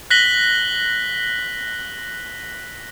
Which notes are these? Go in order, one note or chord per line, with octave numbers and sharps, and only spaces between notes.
F#6 A#6 B6 F#7 G7